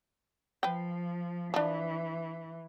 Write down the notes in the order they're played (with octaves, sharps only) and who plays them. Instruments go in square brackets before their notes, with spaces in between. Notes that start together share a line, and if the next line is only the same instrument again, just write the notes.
[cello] F3 [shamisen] B4 G5
[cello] E3 [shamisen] F3 D4